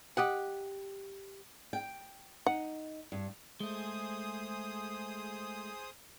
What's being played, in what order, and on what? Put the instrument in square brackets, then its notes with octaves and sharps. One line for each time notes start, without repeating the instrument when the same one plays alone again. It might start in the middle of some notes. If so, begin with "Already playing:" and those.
[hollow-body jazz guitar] G4 D#5 F#5
[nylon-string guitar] G5
[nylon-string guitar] D#4 [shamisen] F#5
[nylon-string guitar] G2
[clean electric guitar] G#3 A3 [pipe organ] G#4 C5 D#6